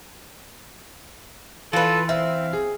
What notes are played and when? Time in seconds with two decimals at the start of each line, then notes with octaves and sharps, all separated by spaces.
1.73 E3 F4 A4 B4
2.09 C4 E5 F5
2.53 G#4